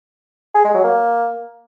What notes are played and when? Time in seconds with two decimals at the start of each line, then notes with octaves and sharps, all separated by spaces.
0.55 G#4
0.64 G#3
0.74 F#3
0.84 A#3